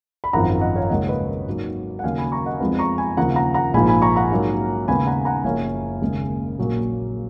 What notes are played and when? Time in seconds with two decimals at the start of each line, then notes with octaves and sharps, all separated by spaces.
0.24 B5
0.33 G#1 F#2 F3 F#5 A#5
0.61 D#5 F#5
0.76 C#5 F5
0.89 D#2 C#3 G#3 C#4 D#5 F#5
1.08 B4 D#5
1.46 G#2 F#3 A#3
1.99 F#5
2.03 D#2 C#3 F#3 F5 G#5
2.18 G#5 B5
2.32 A#5 C#6
2.46 D#5 F#5
2.60 F2 F3 G#3 B3
2.79 A#5 C#6
2.98 G#5 B5
3.17 D#2 C#3 F3 F#5 A#5
3.36 F#5 A#5
3.54 F#5 A#5
3.73 A#1 G#2 F3 A#3 G#5 B5
3.88 G#5 B5
4.02 A#5 C#6
4.16 F#5 A#5
4.31 G#2 F#3 A#3 C#4
4.87 D#2 C#3 G#3 B3 G#5 B5
5.07 F#5 A#5
5.25 F#5 A#5
5.44 F#1 F#2 F3 A#3 C#4 F5 G#5
6.01 D#2 C#3 G#3
6.58 A#1 A#2 F#3 A#3 C#4